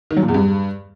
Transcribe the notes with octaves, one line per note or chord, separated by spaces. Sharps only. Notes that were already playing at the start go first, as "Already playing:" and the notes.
D#3
F#3
A#2
E2
G2